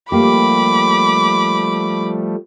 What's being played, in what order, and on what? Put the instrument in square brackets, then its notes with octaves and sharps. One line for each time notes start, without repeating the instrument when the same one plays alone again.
[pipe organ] F3 G3 A3 [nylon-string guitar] A#3 G4 [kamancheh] B5 D6